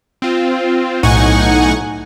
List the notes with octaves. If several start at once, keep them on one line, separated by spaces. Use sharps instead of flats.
C4 F4
B1 A2 D#4 F#5 G#5 C#6